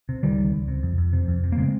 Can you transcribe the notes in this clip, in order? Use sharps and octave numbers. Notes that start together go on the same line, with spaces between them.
C3
C#2 D#3 G3
C#2
C#2
C3
F2
F2
C3
F2
C3
A#3
C#3 G#3 C4